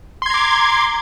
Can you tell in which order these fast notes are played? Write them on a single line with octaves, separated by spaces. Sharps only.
C6 G#6 A#5 D6